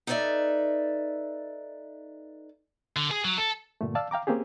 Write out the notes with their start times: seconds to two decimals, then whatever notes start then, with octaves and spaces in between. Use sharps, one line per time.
0.07 D#4 A4 B4 C5 D5 E5
2.96 D3
3.11 G#4
3.25 F#3
3.38 A4
3.81 G2 A#2 D3 A3
3.95 D5 F5 A5 E6
4.11 F5 G5 A#5 D6
4.27 A#3 C4 C#4 G4 G#4